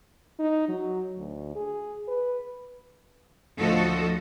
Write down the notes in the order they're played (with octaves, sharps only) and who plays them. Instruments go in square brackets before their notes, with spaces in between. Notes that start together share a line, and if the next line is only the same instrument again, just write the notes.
[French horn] D#4
F#3
D2
G#4
B4
[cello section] D2 A2 F3 F#4 A4 D#5